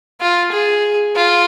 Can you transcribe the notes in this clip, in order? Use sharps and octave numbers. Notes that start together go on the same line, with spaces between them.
F4
G#4
F4